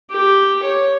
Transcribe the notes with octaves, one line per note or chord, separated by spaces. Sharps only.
G4
C#5